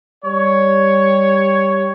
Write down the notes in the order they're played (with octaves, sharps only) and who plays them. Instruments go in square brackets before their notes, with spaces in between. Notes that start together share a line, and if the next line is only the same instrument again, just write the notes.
[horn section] G3 C#5